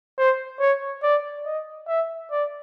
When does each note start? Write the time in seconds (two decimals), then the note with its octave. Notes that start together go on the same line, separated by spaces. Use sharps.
0.18 C5
0.60 C#5
1.03 D5
1.46 D#5
1.88 E5
2.31 D5